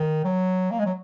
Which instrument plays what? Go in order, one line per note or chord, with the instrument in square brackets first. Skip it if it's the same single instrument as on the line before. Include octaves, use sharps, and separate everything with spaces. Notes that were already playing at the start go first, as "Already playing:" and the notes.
Already playing: [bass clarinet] D#3
F#3
A#3
G#3
F#3